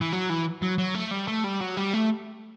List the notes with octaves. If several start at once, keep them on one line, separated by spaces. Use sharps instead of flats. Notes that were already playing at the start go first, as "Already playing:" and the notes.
E3
F#3
E3
F#3
F#3
A3
G3
A3
G3
F#3
G3
A3